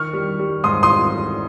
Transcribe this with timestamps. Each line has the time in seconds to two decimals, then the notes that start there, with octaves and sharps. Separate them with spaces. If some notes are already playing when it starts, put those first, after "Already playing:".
Already playing: D#3 C#6 F6
0.13 G3
0.39 G3
0.64 G#2 C6 D#6
0.83 C6 D#6
0.89 G3